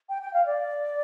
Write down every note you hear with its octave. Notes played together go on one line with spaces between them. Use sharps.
G5
G5
F5
D5